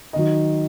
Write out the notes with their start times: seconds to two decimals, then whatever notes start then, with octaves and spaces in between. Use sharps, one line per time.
0.13 D#3 F#3 D#5